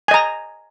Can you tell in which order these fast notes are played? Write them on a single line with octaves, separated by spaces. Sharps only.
G#5 D#5 A#5